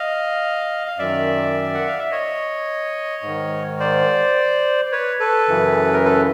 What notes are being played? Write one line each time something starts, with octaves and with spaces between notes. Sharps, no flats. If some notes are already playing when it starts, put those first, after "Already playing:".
Already playing: D#5 F5
F5
F#2 D#3 D5 E5
F#5
F5
E5
C#5 D#5
G#2 D#3
C5 D5
B4 C#5
A4 B4
F#2 C#3 E3
A#4
A4 B4